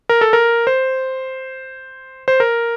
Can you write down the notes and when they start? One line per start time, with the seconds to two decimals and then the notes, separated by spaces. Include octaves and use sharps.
0.09 A#4
0.21 A4
0.33 A#4
0.67 C5
2.28 C5
2.40 A#4